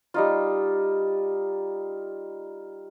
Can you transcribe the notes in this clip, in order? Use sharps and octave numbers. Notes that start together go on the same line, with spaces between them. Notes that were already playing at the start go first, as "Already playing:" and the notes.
G3 D#4 F4